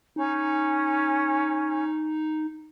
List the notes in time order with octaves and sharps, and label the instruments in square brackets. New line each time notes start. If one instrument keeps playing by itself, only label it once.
[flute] C#4 [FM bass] D#4